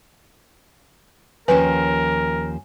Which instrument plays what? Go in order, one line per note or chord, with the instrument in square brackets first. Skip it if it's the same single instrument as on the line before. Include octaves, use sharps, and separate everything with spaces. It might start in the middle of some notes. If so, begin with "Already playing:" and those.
[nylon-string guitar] D#2 F3 C#4 [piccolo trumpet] A#4 [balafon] B4 [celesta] G#5